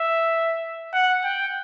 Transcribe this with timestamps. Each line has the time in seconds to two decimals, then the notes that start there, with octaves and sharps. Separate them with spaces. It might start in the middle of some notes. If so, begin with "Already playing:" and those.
Already playing: E5
0.93 F#5
1.24 G5